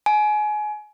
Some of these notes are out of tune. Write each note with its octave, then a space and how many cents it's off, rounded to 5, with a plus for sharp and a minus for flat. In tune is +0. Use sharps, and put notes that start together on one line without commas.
G#5 +25